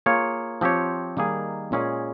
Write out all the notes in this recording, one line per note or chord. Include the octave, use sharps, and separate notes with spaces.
A#3 F4 G#4 C#5
F3 C4 G4 C#5
D#3 G3 A#3 D#4 G#4
A#2 G#3 C#4 G#4